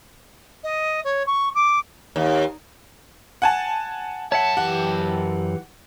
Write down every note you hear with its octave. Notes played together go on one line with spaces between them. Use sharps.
D#5
C#5
C#6
D6
D#2
F#5 G#5 A5
F#2 C#5 E5 F#5 A5
E3 G4 F#5